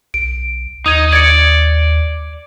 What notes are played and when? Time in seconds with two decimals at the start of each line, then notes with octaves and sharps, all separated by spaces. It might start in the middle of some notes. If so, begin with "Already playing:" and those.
0.14 B1 D7
0.86 D#2 D#4 D#6 G#6
1.13 D5 G#6 A6 C#7